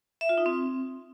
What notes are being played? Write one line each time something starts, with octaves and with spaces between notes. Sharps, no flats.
E5
F4
D#4
C4